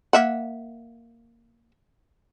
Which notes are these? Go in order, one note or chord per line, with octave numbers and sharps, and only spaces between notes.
A#3 E5 F#5